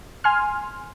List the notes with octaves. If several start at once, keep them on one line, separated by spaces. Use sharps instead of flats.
G#5 C6 F6